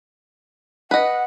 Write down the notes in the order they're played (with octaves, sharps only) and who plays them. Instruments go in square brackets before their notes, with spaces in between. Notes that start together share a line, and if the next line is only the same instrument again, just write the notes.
[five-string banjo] B4 D#5 [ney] F#5